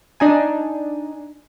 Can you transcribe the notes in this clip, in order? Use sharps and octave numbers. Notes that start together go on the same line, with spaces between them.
D4 D#4 G#5